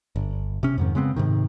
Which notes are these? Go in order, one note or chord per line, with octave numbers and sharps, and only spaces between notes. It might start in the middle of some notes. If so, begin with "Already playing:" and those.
G1
C3 C#4
F2 G#2 D#3
C#3 G#3 B3 C4
G#2 C3 D#3